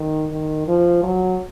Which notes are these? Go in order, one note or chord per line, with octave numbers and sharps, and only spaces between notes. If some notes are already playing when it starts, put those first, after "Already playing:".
Already playing: D#3
D#3
F3
F#3